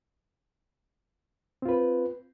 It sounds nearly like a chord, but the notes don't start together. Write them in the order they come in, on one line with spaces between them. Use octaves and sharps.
C4 F4 B4